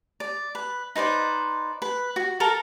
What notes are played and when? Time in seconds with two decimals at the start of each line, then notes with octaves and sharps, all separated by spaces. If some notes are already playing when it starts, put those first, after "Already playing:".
0.20 D5
0.55 B4
0.96 D#4 B4 C5 D5
1.82 B4
2.16 F#4
2.40 A4 A#4